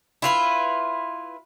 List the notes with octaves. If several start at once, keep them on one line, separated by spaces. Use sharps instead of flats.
E4 F4 B4